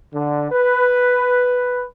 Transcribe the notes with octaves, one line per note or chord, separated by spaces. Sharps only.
D3
B4